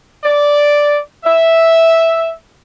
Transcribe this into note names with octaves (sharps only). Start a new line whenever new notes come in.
D5
E5